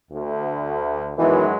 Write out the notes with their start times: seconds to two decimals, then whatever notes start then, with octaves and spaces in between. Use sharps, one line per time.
0.11 D2
1.18 F#2 B2 D#3 E3 F#3 G#3